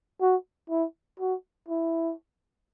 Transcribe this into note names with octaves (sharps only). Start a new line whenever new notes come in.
F#4
E4
F#4
E4